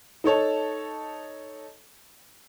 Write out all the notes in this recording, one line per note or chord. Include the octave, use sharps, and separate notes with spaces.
D#4 A4 C#5 A5